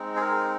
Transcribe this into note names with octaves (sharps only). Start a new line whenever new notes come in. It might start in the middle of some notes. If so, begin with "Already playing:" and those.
Already playing: G#3 C4 D#4
G#4
A#4